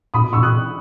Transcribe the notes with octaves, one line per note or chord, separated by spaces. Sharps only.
A#2 B5 D#6
B2
A#2
C#6 E6
B2
A#2 D#6 F#6